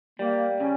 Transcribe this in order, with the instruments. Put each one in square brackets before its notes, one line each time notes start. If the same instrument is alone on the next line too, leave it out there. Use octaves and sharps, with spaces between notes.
[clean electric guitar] G3 [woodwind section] A#3
[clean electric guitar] C#3 [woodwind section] C#4